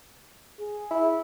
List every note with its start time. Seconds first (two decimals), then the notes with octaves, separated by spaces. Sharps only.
0.60 G#4
0.91 E4